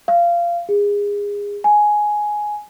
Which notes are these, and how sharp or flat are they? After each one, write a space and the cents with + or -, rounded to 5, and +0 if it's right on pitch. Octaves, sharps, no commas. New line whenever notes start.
F5 -20
G#4 -25
G#5 +10